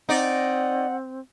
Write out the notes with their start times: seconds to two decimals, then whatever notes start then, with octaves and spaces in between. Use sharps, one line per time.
0.09 C4 D#4 D5 F#5